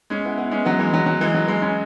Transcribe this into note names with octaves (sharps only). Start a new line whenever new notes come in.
G#3 C#4
B3 E4
B3 E4
G#3 C#4
F#3 B3
E3 G#3
F#3
F#3
E3 G#3
F#3
E3 G#3
G#3 C#4